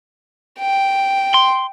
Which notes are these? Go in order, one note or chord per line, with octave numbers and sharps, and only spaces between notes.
G5
C6